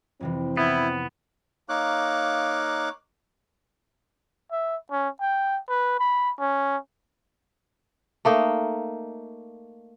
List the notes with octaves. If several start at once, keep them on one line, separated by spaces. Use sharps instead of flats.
F2 C3 E3 C4
B3 E4
A#3 D#4 C#5 F5 D6 F#6
E5
C#4
G5
B4
B5
C#4
A3 A#3 D#4